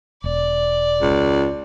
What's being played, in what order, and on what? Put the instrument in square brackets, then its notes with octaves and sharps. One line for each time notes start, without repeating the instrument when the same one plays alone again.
[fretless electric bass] E1 [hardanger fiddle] D5
[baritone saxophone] C#2